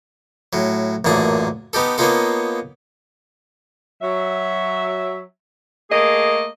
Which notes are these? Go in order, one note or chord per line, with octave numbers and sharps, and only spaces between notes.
A2 F#3
A1 F#2 A#2 G#4 A5
B3 D#4 G4 A4
A#3 B3 C#4 D#4 F4 A4
F#3 E5
A3 A#3 G#4 D#5